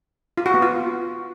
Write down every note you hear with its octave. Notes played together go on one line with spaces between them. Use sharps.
F4
F#4
B3
F4